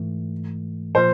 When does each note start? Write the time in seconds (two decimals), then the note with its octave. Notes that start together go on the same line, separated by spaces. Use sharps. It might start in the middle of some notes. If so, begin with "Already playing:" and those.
Already playing: G#2 E3 A3
0.95 A#2 F3 C5